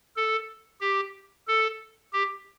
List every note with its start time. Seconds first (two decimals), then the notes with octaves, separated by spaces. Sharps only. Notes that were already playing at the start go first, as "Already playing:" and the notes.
0.16 A4
0.81 G4
1.47 A4
2.13 G4